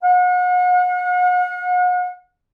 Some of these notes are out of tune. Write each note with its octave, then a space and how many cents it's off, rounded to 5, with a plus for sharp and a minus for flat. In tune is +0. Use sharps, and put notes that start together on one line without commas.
F#5 -40